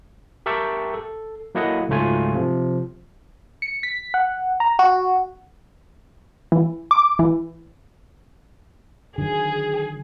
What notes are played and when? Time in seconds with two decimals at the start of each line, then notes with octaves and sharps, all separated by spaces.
0.46 G4 A#4 E5 G5 A5 C#6
0.94 A4
1.55 F#3 A#3 E4 A4 D#5 F#5
1.89 C#2 G#2 F#3 A3 F4 G#5
2.34 C3 F3
3.62 C#7
3.83 B6
4.14 F#5
4.60 A#5
4.79 F#4
6.52 E3
6.91 D6
7.19 E3
9.18 D3 D#3 F#3 G#4